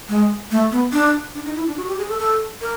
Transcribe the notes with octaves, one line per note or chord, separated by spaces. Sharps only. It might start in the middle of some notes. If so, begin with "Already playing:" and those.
G#3
A3
B3
D4
D4
D#4
E4
D4
F#4
G4
G#4
A4
A4
A#4